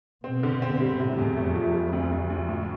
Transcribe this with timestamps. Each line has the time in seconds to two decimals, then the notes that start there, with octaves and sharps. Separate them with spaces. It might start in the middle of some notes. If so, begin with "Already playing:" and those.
0.24 B2 C4
0.43 D3
0.62 C4
0.81 G3
1.00 A2 C3
1.18 E2
1.37 F2 A3
1.56 F3
1.74 G3
1.93 D2
2.12 D2
2.30 D2
2.49 A2